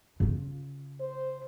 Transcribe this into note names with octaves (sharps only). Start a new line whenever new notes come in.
C#3 F4
C5